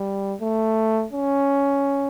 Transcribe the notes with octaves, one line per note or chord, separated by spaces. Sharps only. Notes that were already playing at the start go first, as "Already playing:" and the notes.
Already playing: G3
A3
C#4